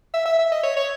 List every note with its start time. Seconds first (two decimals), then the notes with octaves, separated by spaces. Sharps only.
0.14 E5
0.26 E5
0.39 E5
0.52 D#5
0.63 C#5
0.76 C#5